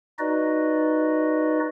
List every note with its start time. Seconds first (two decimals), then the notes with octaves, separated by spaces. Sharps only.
0.19 D#4 F#4 B4 D5 D#5